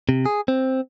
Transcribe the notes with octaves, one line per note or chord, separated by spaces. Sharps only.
C3
G#4
C4